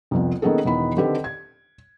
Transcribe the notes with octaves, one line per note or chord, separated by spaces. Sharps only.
C2 F2 B3
D#3 A#3 B3 C#4 G#4 A4
E1 D#3 B3 E4 B5
D3 D#3 C4 G4 A4 B4
G#6